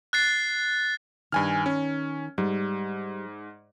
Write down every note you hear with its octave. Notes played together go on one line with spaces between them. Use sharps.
F#6 A6 C7
G2 D#3 G#5 F6
C#4
G#2 G3